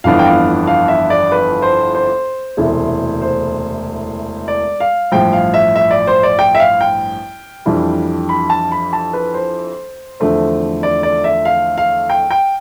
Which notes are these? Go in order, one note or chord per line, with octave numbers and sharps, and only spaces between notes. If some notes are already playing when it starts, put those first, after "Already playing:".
G1 F2 E3 B3 D4 F5
G5
F5
F5
E5
D5
B4
C5
C5
E1 D2 C3 E3 A3
C5
D5
F5
A1 G2 F3 G5
F5
E5
E5
D5
C5
D5
G5
E5
F5
G5
F2 E3 G3 D4
B5
A5
B5
A5
B4
C5
E2 D3 F3 A3 C4
D5
D5
E5
F5
F5
G5
G5